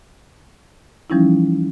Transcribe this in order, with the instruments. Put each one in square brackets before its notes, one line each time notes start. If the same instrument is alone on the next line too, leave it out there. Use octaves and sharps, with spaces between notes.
[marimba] E3 F3 G3 C#4 D#4 E4